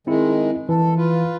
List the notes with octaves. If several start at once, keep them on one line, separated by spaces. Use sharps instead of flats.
D#3 G#3 C4 E4
E3 A4
F4 B4